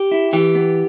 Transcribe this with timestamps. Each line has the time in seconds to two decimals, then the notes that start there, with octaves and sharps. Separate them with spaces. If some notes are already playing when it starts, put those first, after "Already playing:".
Already playing: G4
0.12 E4
0.33 E3 G4
0.55 B3